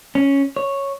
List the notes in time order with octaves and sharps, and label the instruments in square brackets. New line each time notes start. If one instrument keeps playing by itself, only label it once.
[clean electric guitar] C#4
C#5